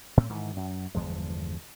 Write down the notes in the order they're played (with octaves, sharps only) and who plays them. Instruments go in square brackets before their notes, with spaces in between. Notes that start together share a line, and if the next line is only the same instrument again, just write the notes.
[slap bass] A2 C4
G#2 D#3 E3
F#2
G1 E2 F3 G#3